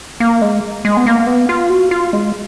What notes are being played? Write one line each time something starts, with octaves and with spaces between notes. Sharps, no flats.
A#3
G#3
G#3
B3
A#3
B3
F4
F#4
F4
G#3